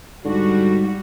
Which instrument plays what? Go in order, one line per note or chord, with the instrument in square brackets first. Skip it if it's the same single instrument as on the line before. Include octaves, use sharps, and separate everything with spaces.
[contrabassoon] G#2 [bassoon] D3 [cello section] G3 F#4